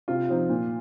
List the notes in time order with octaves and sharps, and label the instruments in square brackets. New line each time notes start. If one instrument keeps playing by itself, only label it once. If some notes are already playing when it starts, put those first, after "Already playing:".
[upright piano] C3 [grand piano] F4
[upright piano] F3 C4 D#4
A#2